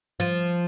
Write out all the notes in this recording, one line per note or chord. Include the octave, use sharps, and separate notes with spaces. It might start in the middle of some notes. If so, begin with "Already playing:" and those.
F3